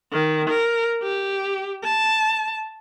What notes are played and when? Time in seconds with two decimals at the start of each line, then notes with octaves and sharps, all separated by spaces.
0.13 D#3
0.50 A#4
1.03 G4
1.84 A5